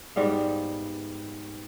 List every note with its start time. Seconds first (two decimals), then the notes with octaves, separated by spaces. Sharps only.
0.16 G#2 G3 B3 F5